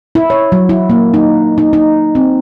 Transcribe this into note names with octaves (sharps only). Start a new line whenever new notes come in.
E4
C#5
F#3
E4
A#3
D#4
D#4
D#4
C4